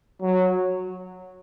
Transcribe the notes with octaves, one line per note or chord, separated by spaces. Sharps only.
F#3